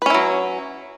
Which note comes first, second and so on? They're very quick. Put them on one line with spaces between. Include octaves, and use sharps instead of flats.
B4 C#4 E4 F#3